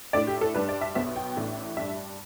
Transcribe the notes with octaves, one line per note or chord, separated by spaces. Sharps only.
A2 A3 D4 D5
G4
A4
G2 G3 D4 B4
D5
E5
B1 B2 B3 E5
G5
A1 A2 A3 D4
G2 G3 D4 E5